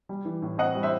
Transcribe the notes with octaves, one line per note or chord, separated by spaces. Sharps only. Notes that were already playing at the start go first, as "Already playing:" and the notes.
G3
E3
A2
C4 D#5 F#5
G3
C5 E5